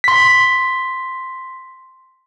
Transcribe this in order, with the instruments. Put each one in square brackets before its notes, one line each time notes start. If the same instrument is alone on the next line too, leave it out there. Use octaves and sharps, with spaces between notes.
[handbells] C6 B6